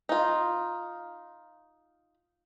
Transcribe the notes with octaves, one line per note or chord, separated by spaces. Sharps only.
D#4 F4